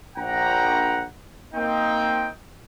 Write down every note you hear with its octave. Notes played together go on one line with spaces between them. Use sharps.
A#1 F#5 G5 A#5
A#3 C4 D#4 G5